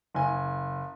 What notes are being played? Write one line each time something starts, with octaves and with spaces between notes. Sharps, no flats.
F#1 G#5